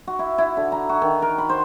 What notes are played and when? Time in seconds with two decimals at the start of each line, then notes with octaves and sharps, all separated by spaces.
0.07 F#4
0.19 E4
0.38 E4
0.57 D3
0.72 A#5
0.89 F#4
1.02 D#3
1.22 A#4
1.38 B5
1.49 C5